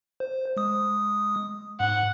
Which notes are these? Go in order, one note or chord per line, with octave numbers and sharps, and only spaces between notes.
C5
G#3 D#6
G#2 F#5